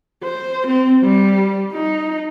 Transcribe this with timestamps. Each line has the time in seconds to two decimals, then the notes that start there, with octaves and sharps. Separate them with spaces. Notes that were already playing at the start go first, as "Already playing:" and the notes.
0.24 C5
0.67 C4
1.03 G3
1.72 D#4